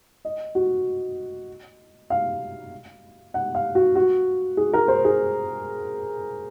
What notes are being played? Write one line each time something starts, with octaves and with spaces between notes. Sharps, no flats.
D#5
F#4
F5
F#5
F5
F#4
F#4
G#4
A#4
C5
G#4